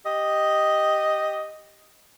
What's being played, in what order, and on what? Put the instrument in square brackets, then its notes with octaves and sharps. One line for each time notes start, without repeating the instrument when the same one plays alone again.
[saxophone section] G4 D#5